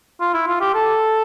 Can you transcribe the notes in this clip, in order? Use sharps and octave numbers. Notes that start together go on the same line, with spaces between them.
F4
E4
F4
G4
A4